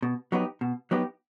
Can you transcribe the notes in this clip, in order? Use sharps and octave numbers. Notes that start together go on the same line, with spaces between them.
B2
F#3 B3 D#4 G4
B2
F#3 B3 D#4 G4